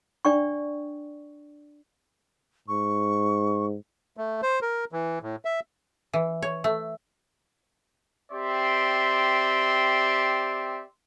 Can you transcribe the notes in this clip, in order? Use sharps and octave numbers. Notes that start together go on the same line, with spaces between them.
D4 D5 G5 C#6
G#2 C#6
A3
C5
A#4
E3
A2
E5
E3
C#5
A3
C4 G4 D5 E5 C6